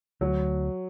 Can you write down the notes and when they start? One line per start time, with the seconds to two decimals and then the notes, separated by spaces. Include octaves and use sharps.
0.21 D2 F#3